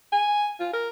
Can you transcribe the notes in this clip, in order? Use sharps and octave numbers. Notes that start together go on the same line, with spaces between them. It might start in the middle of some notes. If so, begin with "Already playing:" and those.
G#5
F4
A#4